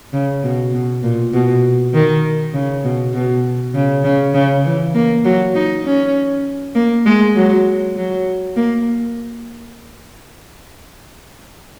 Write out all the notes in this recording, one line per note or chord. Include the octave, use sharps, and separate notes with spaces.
C#3
B2
B2
A#2
B2
D#3
C#3
B2
B2
C#3
C#3
C#3
E3
A#3
F#3
D#4
C#4
A#3
G#3
F#3
F#3
A#3